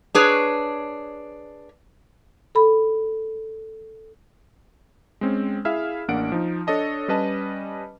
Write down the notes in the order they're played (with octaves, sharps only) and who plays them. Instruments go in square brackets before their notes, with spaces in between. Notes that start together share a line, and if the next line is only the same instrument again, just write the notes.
[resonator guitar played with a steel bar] D4 G#4 B4 C#5
[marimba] A4 B5
[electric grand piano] G#3 C4 C#4
E4 G#4 E5 F5 F6
A1 A#3 D4 F#5 D7
F3 D#4
D4 A4 C#5 D#5 A5
G3 C#4 B4 D#5 A5